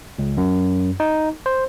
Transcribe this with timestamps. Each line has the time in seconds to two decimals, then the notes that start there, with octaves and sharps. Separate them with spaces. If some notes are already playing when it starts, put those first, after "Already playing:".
0.19 C#2
0.37 F#2
1.00 D#4
1.46 C5